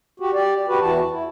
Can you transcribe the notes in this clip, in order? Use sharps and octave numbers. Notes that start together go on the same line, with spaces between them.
F#4 G4
G4 D5
F#4 G4 B4
E2 E3 F#4 A5
E4